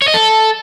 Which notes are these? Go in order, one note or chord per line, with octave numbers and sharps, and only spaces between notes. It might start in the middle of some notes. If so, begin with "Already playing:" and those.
C#5
D#5
A4